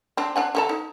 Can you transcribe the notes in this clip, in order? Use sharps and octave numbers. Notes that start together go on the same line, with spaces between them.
C4 D4
D4 F#5 G#5
D3 A4 A#5
D#4